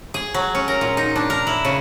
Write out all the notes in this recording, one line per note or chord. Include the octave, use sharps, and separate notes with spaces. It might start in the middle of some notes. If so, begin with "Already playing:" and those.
G#4
F#3
C#4
A#4
A#2
D#4
D4
A#4
E4
C#3